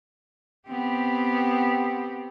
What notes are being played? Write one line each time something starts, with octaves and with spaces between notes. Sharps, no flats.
B3 C4 G4